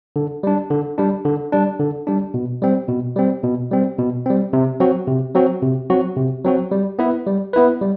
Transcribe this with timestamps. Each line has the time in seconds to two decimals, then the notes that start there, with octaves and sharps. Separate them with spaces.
0.16 D3
0.43 G3 D4
0.71 D3
0.98 G3 D4
1.25 D3
1.52 G3 D4
1.80 D3
2.07 G3 D4
2.34 B2
2.62 G3 C4
2.89 B2
3.16 G3 C4
3.44 B2
3.71 G3 C4
3.99 B2
4.26 G3 C4
4.53 C3
4.80 F#3 C4 F#4
5.08 C3
5.35 F#3 C4 F#4
5.63 C3
5.90 F#3 C4 F#4
6.17 C3
6.45 F#3 C4 F#4
6.72 G3
6.99 B3 E4 B4
7.27 G3
7.53 B3 E4 B4
7.81 G3